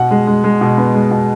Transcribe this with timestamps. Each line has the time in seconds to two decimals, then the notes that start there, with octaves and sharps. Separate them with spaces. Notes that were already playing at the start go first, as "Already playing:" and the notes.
Already playing: B2 F#5
0.11 G#3
0.27 G#3
0.44 G#3
0.61 B2
0.78 B3
0.94 G#3
1.11 B2